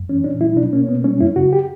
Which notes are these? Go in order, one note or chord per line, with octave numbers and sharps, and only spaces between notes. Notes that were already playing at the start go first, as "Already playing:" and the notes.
Already playing: F#2
E3 C#4
A#2 D4
F#3 E4
B2 D4
A#3 C#4
B2 B3
G3 C#4
F#2 E4
C#3 F#4
G4